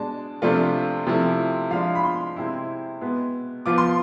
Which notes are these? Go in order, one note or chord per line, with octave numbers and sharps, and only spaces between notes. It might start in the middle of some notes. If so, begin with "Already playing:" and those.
Already playing: B2 G#3 D4 A5
C3 F3 A3 D4 F4
C3 F3 A3 E4
F3 G#3 D4 F5
B5
C6
C3 G#3 C4 E4
B2 G#3 B3
F3 B3 F4 D6
C6